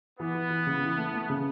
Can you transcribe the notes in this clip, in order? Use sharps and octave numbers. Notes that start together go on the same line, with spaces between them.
E3 B3
E3
E3
C#3
E3
A3
A3
C#3